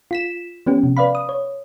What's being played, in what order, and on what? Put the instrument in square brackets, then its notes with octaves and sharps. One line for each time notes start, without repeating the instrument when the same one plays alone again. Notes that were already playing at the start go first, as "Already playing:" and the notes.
[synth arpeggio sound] F4 B6 E7
F3 B3 C#4 G4
C3
B4 D5 F5 B5
D#6
C#5